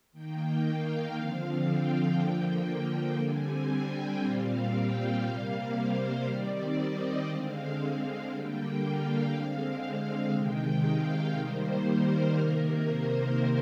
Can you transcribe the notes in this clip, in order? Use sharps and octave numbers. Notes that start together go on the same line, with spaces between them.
D#3 A#3 G5
F5
D3 F3 C4
G5
D3 F3 A#3
D3 G3 C4 G#5
G5
A#2 G3 C4 F5
G5
C3 G3 A#3 F5
C5
D#3 G3 C4 D5
D#5
D3 G#3 C4 F5
F5
D3 G3 A#3 G5
F5
D3 G#3 C4
F5
C3 D#3 G#3 G5
F5
D#3 G3 A#3 C5
A#4
C3 D#3 A#3 A#4
C5